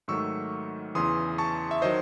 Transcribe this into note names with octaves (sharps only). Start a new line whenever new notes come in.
G#2 D#3 F#3 A3 C#6 E6
E2 C#3 E3 C6 D#6
A5 C#6
E5
D#3 F#3 C5 D#5